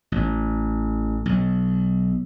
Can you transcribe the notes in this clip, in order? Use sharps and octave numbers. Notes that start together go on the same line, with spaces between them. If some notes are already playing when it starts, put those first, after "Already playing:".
A1
B1